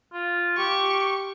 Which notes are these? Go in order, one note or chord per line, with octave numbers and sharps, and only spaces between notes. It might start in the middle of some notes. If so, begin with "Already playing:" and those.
F4
G4 C#6